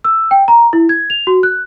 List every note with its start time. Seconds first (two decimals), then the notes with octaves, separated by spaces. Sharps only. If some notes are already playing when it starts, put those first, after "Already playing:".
0.04 E6
0.31 G5
0.48 A#5
0.73 E4
0.89 G#6
1.10 F7
1.27 F#4
1.43 F#6